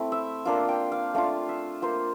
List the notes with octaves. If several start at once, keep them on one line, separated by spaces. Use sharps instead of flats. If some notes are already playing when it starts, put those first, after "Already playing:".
Already playing: A3 C4 E4
E5
A#3 D4 F4 F5
G5
F5
A3 D4 F4 F5
E5
A#3 F4 C5